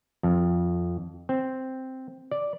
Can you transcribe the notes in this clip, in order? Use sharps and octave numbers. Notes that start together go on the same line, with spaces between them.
F2
C4
D5